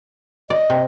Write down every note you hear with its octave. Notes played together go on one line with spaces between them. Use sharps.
D5 D#5
C3